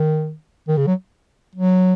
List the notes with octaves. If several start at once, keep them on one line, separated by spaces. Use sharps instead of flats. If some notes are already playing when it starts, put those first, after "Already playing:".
Already playing: D#3
D#3
C#3
F#3
F#3